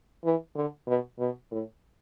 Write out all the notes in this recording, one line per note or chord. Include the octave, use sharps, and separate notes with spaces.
E3
D3
B2
B2
A2